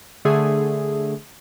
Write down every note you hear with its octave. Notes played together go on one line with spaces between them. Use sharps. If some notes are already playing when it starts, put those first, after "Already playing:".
D3 A3 G#4